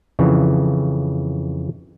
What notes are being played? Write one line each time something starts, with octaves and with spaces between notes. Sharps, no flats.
F2 C#3 E3